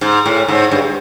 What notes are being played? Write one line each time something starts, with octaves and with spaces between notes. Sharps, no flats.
G#2
A2
G#2
G2